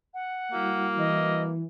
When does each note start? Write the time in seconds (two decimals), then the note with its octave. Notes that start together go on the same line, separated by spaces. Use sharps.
0.14 F#5
0.52 G3 A#3 E4 F#4
0.99 E3 D#5